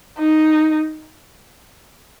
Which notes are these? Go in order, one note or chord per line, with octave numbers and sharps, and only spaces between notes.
D#4